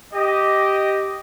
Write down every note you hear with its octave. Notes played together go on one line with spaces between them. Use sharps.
G4 D#5